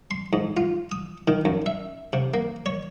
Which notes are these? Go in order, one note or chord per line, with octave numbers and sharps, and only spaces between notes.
C6
G#2
F4
D#6
D#3
F#2
E5
C3
A#3
C#5